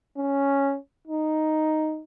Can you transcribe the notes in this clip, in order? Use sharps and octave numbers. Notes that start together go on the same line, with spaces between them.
C#4
D#4